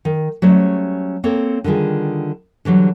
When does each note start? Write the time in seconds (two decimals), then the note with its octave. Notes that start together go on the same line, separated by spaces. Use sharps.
0.05 D#3
0.42 F#3 G3 A3 C#4 C5 C#5
1.24 A#3 C4 A4 C#5
1.64 D3 D#3 G3 F4 G#4
2.65 D3 E3 F#3 G3